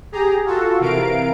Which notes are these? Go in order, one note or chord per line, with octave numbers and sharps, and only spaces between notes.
G4 G#4 A#5
F4 F#4 A4
C3 E3 A#4 F5 D7